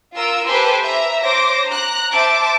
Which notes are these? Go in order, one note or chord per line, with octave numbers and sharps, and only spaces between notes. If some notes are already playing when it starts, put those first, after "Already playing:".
F4 A#4 E6
G4 A4 B4 C5 G#5 C6
E5 A#5
C5 C#5 D6 A#6
A#5 F#6
C5 E5 A5 D6